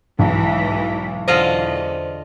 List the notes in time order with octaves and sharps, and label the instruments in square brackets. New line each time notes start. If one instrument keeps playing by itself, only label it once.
[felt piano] B1 [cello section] G#2 E3
[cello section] E2 [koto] D3 F4 D#5 [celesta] C5